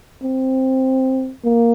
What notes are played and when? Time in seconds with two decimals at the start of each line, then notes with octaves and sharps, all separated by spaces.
0.23 C4
1.44 A#3